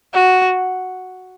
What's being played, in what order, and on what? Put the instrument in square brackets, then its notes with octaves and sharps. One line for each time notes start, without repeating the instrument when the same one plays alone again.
[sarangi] F#4